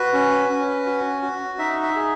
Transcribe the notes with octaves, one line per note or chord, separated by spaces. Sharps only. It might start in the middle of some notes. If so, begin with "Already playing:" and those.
Already playing: F#4 B4
C#4
C#4
F#4
F#4
D#4 E5
E5
G#4